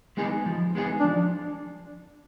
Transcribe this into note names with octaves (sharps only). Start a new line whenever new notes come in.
G#3 B3 D#4 G#4
F3
G#3 B3 D#4 G#4
D4
F3